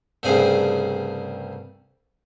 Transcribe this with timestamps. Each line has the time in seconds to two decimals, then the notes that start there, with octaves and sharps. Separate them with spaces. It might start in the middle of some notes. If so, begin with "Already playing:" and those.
0.23 C2 G2 C#3 A3 G#4 C5